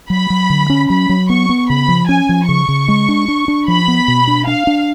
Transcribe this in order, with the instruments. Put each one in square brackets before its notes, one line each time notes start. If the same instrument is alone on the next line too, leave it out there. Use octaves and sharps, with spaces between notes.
[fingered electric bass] F#3 [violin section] B5
[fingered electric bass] F#3
D3
C#4
[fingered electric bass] F#3 [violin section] B5
[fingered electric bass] F#3
[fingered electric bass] B3 [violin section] C#6
[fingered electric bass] B3
[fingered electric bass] C#3 [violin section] B5
[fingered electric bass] F3
[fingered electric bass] C#4 [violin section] G#5
[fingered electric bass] F3
[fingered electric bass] C#3 [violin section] C#6
[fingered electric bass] C#3
G#3
D4
D4
D4
[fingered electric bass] F3 [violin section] B5
[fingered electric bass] B3
B2
D4
[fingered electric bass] D4 [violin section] F5
[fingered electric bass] D4